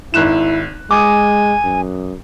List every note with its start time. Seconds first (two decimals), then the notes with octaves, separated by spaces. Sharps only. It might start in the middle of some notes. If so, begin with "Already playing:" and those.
0.14 G#1 E4 F#6 E7
0.91 G#3 G#5 D6 D#6
1.64 F#2